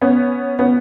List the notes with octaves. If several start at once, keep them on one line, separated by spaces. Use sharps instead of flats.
B3 C#4
B3 C#4